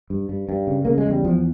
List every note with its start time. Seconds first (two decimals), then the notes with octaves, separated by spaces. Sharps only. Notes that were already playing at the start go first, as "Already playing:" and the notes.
0.10 G2
0.29 G2
0.49 G2
0.67 C#3
0.85 C#3 A#3
0.98 G#3
1.06 E2
1.11 G3
1.24 E2 F3